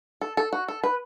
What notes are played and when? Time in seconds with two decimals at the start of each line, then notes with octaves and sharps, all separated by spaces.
0.21 A4
0.37 A4
0.53 F#4
0.68 A4
0.83 B4